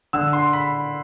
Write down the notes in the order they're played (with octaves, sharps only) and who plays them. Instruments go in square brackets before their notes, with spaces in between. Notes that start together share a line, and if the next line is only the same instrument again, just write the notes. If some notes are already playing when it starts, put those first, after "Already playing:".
[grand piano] D3 E6
C6
B5